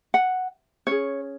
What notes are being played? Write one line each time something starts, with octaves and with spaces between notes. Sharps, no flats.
F#5
C#4 G#4 C#5